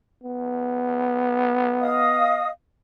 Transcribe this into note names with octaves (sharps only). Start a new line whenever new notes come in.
B3
D#5 F5 D#6